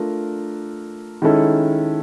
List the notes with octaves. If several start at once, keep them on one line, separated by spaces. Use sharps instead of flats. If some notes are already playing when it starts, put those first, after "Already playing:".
Already playing: A3 D4 F4 A#4
D#3 G#3 C#4 E4 A4